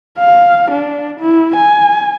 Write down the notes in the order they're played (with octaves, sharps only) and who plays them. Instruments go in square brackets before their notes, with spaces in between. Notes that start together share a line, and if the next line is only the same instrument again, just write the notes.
[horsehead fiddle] F5
D4
E4
G#5